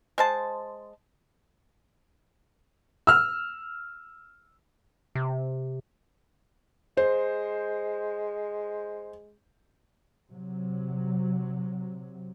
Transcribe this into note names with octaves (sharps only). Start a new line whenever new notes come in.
G#3 C5 A5
E6 F6
C3
G#3 C5
C3 F#3